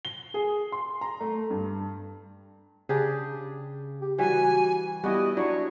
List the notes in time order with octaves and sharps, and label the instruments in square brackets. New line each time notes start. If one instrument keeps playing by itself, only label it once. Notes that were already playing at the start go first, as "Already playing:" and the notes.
[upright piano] G7
G#4
C6
A#5
A3
G2
[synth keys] C#3 [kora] D4 G4 G#4
[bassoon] G4
[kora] E3 G3 [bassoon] F#4 [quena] G#5
[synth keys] G3 B3 E4 [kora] F#4 [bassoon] G4 [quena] D#5
[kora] F#3 [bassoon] D4 [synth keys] E4 [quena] C#5